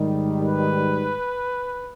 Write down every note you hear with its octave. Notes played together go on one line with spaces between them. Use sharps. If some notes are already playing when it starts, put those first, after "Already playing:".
Already playing: G#2 D#3 G3
B4